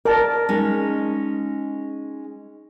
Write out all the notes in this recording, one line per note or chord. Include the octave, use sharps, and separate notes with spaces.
A#4 D5 A5
G#3 C#4 D#4